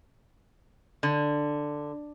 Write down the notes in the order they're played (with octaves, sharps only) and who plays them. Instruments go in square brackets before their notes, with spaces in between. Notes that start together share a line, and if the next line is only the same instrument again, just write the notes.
[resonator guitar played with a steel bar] D3